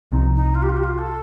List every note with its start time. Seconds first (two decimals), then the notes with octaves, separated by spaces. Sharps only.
0.12 C2 C3 F3 C4 D#4
0.36 D#4
0.55 F4
0.62 G4
0.69 F4
0.77 G4
0.83 F4
0.98 A4